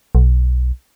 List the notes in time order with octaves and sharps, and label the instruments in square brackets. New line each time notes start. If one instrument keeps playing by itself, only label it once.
[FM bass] B1